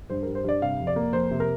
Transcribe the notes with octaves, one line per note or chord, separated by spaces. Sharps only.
G2 C5
G3 A#4
C5
G2 D5
C3 F5
F2
D5
A#3
F2 C5
C3
A#4